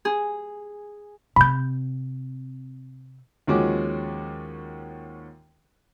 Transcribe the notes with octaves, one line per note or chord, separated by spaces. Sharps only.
G#4
C3 C4 B5 G6
D#2 F3 G#3 C#4 F#4 D6